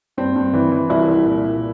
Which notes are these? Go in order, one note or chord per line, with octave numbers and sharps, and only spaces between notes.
G2 C4
G2
E3
E3
C2 E4
C2
A#2
A#2